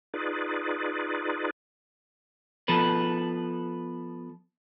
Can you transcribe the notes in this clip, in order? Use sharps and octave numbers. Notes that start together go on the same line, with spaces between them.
D#4 F4 G#4 B4 D5
F3 B3 A4 B4